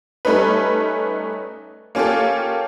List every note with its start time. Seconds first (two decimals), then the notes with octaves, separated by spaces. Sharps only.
0.25 G3 A3 C#4 D#4 B4
1.95 A#3 C#4 F4 G4 A4